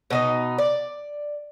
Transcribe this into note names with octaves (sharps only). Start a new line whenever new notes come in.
B2 D#4 D#5
D5